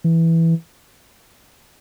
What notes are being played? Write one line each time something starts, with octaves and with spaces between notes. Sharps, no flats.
E3